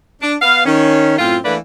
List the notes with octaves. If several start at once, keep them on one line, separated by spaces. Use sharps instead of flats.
D4
B3 F5
D#3 C#4
F#2 A2 C4 F4
E3 A3 A#3 D4 B4 D5